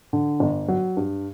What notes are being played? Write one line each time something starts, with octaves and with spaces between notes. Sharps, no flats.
D3
G1
F#3
G2